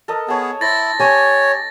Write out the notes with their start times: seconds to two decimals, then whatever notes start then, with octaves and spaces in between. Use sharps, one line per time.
0.08 A4 A#4 D#5
0.28 B3 G#4 C#5 A5
0.61 E4 C5 A6 A#6
0.99 C#4 G4 C#5 G#5